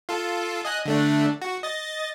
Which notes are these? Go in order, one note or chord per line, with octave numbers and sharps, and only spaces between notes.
F4 A4
D#5 G#5 F#6
D3 A3 D4
F#4
D#5 A6